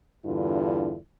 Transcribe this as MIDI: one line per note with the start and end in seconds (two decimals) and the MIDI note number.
0.25 0.96 40
0.25 0.96 43
0.25 0.96 50
0.25 0.96 64
0.25 0.96 65